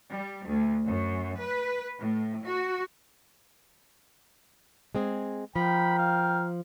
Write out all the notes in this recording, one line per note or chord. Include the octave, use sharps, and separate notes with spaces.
G3
D2
F#2
B4
A2
F#4
G#3 C4 G#4
F3 A#4 G5 B5
F5